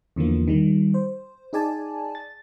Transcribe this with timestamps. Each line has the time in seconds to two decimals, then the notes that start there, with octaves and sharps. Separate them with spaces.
0.16 E2 D3 E3 F3 A#3
0.48 D#3 G3
0.94 C5
1.53 D#4 G#4 D5 G#5 A5
2.15 A6